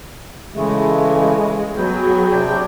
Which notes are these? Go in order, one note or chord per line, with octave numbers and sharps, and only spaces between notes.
C#3 E3 G#3 A3
F#3 B3 G#4 G5
C3 D4 G5